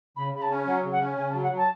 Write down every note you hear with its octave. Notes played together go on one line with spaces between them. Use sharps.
C#3 B5
C#3 B5
A5
C#4
F#3 F#5
C#3
F#5
C#4
C#3 G#5
A5
F#3
F#5
F#3
A5